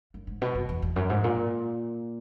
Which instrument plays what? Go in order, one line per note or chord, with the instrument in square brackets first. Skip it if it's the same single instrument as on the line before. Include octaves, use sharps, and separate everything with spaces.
[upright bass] F#2
G#2
B2
F#2
E2
E2
F#2
G#2
A#2